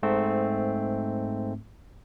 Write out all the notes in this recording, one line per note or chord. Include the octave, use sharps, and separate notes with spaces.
G#2 A3 C4